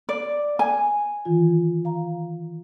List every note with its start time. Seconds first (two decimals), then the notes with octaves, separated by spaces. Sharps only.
0.09 D5
0.59 G#5
1.25 D#3 E3 F4
1.85 F5 A#5